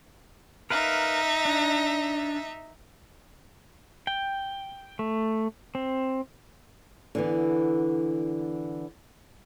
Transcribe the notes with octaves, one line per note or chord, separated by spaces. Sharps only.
D#4 A#4 B4 E5 F5
D4
G5
A3
C4
D3 E3 B3